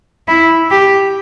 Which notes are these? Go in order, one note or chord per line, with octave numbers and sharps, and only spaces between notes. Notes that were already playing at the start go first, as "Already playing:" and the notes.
E4
G4